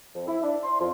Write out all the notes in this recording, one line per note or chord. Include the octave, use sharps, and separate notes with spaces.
F2
E4
D4
C6
F2